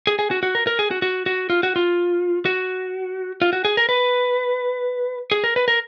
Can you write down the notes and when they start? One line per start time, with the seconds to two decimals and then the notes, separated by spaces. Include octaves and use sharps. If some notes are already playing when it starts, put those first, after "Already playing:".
0.07 G#4
0.19 G#4
0.31 F#4
0.43 F#4
0.55 A#4
0.67 A#4
0.79 G#4
0.91 F#4
1.02 F#4
1.26 F#4
1.50 F4
1.63 F#4
1.76 F4
2.45 F#4
3.42 F4
3.53 F#4
3.65 G#4
3.77 A#4
3.89 B4
5.32 G#4
5.44 A#4
5.56 B4
5.68 A#4